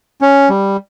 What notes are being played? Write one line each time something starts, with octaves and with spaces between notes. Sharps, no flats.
C#4
G3